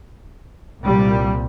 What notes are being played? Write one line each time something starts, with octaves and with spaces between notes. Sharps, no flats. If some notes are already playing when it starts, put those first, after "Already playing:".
C2 A#2 G3